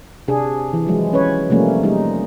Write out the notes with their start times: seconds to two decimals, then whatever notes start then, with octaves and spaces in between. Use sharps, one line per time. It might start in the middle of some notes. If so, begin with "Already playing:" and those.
0.28 C3 D4 G#4
0.73 E3
0.86 F3 F#3 G#3
1.13 C#4 B4 C#5
1.50 C3 F3 G3 A3 A#3 C#4
1.83 G3 G#3 D#4